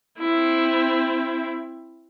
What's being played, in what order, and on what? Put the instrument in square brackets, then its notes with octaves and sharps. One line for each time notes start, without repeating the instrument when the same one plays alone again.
[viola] C4 E4